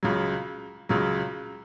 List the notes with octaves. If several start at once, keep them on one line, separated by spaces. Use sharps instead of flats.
C#2 C#3 F#3
C#2 C#3 F#3